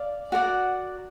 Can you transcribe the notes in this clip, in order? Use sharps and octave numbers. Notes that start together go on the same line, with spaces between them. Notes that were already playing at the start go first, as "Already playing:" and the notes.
Already playing: D5 F5
F#4 A#4 D5 F#5